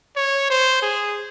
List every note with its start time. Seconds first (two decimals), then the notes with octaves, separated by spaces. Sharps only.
0.16 C#5
0.50 C5
0.82 G#4